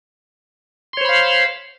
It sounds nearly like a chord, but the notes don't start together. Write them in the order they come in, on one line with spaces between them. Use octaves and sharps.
C6 C#5 C5 B5 F5